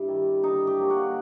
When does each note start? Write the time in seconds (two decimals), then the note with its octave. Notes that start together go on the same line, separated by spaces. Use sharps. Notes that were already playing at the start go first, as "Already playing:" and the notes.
Already playing: G2 E4
0.08 D#3 G3
0.43 D3 D#4
0.67 G4
0.79 F#3 A#3
0.90 F#4